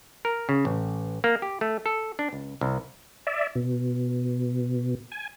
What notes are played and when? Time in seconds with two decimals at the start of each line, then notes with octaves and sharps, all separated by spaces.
0.25 A#4
0.49 C#3
0.65 A1
1.24 A#3
1.42 G4
1.61 A3
1.86 A4
2.19 D4
2.33 C#2
2.61 C2
3.27 D5 E5
3.56 B2
5.12 G#5